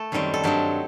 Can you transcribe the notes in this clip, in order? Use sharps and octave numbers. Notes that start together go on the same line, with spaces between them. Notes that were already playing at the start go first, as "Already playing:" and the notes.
Already playing: A3 A4
F#2 D#3 G3 C4
A4
G2 F#3 C4 G4